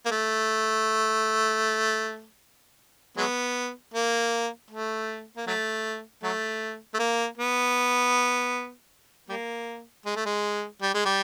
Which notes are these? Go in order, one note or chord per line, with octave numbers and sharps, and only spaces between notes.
A#3
A3
F#3 G#3 B3
A#3
A3
A#3
F#3 A3
F#3 A3
A3
A#3
B3
G3 A#3
G#3
A3
G#3
G3
G#3
G3